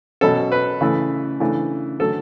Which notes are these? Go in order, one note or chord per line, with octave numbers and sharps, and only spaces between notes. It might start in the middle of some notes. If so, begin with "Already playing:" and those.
B2 F#3 C#4 A4
B4
C#3 E3 A3
C#3 E3 A3 D4
D3 F#3 A3 A4